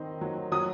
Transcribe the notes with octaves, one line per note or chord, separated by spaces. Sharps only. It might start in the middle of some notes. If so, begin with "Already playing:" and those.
Already playing: D#3 C4 D#4 C6
F#3
F#3 D#6